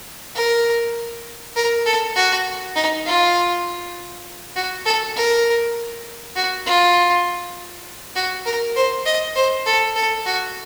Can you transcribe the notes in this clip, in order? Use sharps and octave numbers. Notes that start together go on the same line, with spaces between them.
A#4
A#4
A4
F#4
D#4
F4
F#4
A4
A#4
F#4
F4
F#4
A#4
C5
D#5
C5
A4
A4
F#4